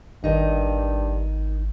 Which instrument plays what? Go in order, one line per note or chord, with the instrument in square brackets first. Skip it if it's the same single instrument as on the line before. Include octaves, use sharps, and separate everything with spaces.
[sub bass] G#1 [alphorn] G2 [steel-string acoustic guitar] D#3 D#4